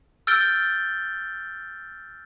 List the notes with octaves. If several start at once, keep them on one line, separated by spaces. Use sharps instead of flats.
E6 F6 G6 A6 D7 G7